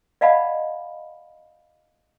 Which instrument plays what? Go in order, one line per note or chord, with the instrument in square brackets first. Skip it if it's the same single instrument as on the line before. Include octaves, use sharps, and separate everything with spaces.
[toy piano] D5 D#5 F5 F#5 A5 B5